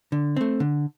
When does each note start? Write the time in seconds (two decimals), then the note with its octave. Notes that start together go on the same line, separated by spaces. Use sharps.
0.12 D3
0.37 A3 C4
0.60 D3